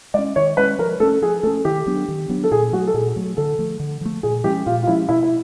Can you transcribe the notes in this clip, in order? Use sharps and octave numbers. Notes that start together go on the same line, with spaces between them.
G#3 C#4 D5
D#3 C#5
G#3 C#4 B4
F3 A#4
A3 C#4 A4
F3 G#4
A3 C#4 A4
D#3 G4
F#3 B3 D4
D#3
F#3 B3 D4
A4
A#2 G#4
F#3 A3 F#4
A4
A#2 G#4
F#3 A3
D3 A4
F3 A3
D3
F3 A3
A#2 G#4
F3 G#3 C#4 G4
A#2 F4
F4
F3 G#3 C#4 E4
B2 E4
E4